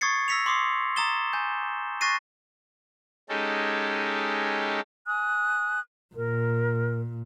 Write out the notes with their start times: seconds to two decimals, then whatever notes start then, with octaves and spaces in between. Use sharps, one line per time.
0.01 C#6 D#6 G#6 A6 C7 C#7
0.28 E6 A#6 B6 C#7 F7
0.46 C6 D6 D#6 C7
0.96 A#5 D#6 A6 E7 G7
1.33 G#5 G6
2.01 C#6 F#6 A6 A#6 C7 D#7
3.29 G#3 C#4 D#4 G4 A4
5.07 G#5 D#6 F#6
6.15 A#2 A#4